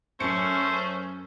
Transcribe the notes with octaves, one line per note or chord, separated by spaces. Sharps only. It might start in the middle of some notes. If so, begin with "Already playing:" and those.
F#2 A3 C#4 C5 C#7